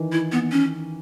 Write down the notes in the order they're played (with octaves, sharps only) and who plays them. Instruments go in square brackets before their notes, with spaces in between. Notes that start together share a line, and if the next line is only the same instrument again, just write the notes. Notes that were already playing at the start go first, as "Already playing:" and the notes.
Already playing: [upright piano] D#3 E3
[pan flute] E4
B3
C#4